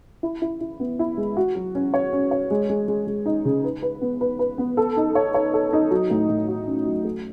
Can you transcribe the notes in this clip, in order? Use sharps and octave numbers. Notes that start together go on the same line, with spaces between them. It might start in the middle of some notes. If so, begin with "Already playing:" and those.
E4
E4
E4
B3
E4
G#3
F#4
F#3
C#4
C#5
C#4
C#5
G#3
G#3
G#3
G#3
D#4
C#3
B4
B4
B3
B4
B4
B3
A4
D#4
C#5
C#5
A4
D#4
F#3
A2
A2
F#4
C#4
F#3
A3